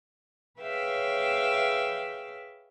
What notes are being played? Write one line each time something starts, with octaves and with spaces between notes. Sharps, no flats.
G#4 B4 C#5 E5 F5 G5